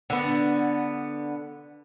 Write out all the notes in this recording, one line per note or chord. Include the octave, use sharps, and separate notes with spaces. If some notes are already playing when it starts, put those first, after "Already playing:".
D3 B3